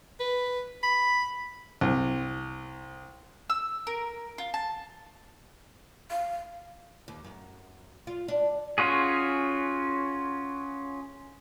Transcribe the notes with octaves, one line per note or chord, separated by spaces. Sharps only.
B4
B5
C2
E6
A#4
F4
A5
F5
D#2
F#2
F4
D4
C#4 F4 F#4 G#4